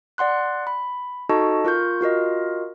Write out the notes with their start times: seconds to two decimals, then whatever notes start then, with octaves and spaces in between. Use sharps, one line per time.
0.18 D5 F#5 C6 F#6
0.67 B5
1.29 D#4 F#4 A4 D#5 A5 C#6
1.65 F4 A#4 C#6 G6
2.01 F4 F#4 A#4 D#5